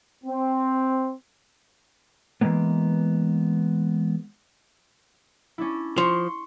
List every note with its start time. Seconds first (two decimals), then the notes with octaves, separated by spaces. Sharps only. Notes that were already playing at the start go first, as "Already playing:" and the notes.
0.24 C4
2.41 E3 F3 G#3 A#3 B3
5.58 C#4 D4 E4
5.98 F3 C6 C#6